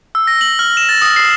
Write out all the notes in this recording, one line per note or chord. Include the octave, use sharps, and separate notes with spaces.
E6
A#6
F#7
F6
E7
A6
D#6
C7